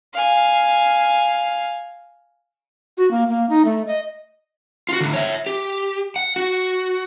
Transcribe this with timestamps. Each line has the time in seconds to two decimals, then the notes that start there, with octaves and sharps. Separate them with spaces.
0.14 F5 G#5
2.97 F#4
3.11 A#3
3.29 A#3
3.49 D#4
3.65 A3
3.87 D#5
4.89 F4 F#4
5.01 A2 D3
5.13 C#5 E5
5.46 G4
6.16 F#5
6.36 F#4